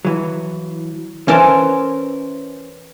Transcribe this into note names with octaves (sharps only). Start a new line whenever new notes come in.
E3 F#3
E3 C#4 A#4 C5 G#5 A5